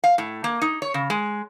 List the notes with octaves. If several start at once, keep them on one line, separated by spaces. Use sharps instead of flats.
F5
A2
A#3
D#4
C#5
C#3
G#3